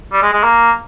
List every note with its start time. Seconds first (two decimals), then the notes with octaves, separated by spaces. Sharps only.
0.12 G3
0.22 G#3
0.33 G#3
0.44 A#3